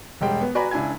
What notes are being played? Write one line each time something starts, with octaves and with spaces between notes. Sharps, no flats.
E1 G3 G#3 G5
B3
F#4 B4 D5 G#5 A#5 B5
C#2 D4 E4 G#5 G#6